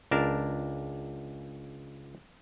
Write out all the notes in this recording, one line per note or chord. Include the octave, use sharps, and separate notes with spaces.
C#2 D4 A#4 A5